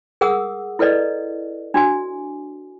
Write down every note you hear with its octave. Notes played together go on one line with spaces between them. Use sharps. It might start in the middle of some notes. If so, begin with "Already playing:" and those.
G#4 A#4 F#5 D#6 E6
E4 A4 B4 D5 D#5
D4 F#4 G#5